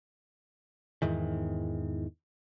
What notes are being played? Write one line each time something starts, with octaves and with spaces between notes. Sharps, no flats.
E2 G#2 D#3 E3